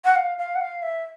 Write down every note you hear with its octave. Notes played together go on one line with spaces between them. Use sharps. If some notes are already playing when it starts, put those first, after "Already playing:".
F#5
F5
F5
F#5
F5
E5